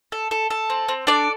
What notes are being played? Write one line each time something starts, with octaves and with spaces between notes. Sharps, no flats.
A4
A4
A4
C4
C4
D4 A4 D5